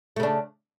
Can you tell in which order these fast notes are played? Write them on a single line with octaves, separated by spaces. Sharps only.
A3 C#3 D4